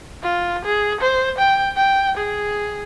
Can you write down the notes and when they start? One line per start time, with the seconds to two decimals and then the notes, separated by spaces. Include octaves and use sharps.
0.23 F4
0.65 G#4
1.01 C5
1.38 G5
1.76 G5
2.17 G#4